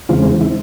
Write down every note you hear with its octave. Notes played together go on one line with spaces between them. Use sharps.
E2 C#3 E3 G#3 C4 F4
E4